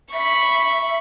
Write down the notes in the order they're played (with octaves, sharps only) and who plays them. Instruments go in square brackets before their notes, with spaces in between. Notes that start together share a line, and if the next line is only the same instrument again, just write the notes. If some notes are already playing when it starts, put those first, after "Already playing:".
[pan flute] E5 [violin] B5 C#6